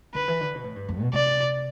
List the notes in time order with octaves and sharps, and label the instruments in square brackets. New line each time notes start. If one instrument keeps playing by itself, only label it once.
[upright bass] D3 [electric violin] B4
[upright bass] E3
D3
B2
A2
G2
F2
B2
[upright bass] C3 [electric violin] D5